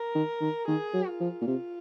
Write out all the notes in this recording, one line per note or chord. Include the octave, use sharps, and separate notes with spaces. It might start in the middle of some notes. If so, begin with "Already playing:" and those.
Already playing: A#4
D#3
D#3
D#3 G#4
F#3
F4
F3
A#2
C3 F4